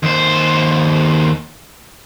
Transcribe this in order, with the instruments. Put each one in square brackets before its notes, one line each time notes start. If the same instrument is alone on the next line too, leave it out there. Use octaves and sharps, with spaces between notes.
[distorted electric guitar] D#2 C5